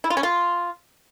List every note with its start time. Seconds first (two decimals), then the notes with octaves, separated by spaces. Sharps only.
0.04 E4
0.10 F4
0.17 C#4
0.23 F4